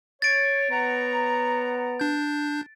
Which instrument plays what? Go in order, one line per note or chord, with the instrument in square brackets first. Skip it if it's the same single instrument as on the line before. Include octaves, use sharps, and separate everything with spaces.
[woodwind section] C#5 [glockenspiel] A6 D7
[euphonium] B3 [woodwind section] C#5 F#5 A#5
[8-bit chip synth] D4 G6